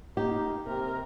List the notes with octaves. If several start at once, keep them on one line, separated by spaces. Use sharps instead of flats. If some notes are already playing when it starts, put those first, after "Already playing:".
A#3 D#4 G4
C3 A#4